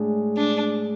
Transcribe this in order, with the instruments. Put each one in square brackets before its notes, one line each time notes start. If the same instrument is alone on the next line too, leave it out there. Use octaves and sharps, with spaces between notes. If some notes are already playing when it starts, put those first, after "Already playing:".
Already playing: [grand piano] A2 G#3 D4 G#4
[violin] D4